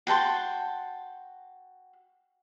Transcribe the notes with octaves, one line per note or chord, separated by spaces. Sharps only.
F#4 G5 A5 C6